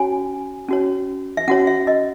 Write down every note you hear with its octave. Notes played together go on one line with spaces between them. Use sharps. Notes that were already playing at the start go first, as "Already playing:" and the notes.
Already playing: C#4 F#4 C#5 G#5
C#4 F#4 C#5
E5
C#4 F#4 C#5 F#5
E5
D#5